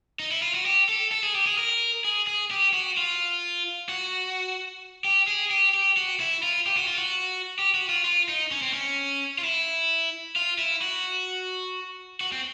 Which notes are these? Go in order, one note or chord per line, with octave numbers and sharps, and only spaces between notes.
D#4
E4
F4
F#4
G4
A4
A4
G#4
G4
G#4
A#4
G#4
G#4
G4
F#4
F4
F#4
G4
G#4
G4
G4
F#4
E4
F4
G4
F#4
F4
F#4
G4
F#4
F4
F4
D#4
C#4
C4
C#4
F4
E4
F4
E4
F#4
F#4
C4